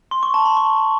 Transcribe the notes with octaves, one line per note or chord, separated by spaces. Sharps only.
C6
C#6
A5
B5
C#6